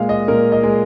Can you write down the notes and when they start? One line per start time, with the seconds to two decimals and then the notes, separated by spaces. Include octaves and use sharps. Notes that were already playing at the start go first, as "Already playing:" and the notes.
Already playing: A#2 G#3 F5
0.09 D#5
0.28 A#2 A#4
0.52 D#5
0.63 G#3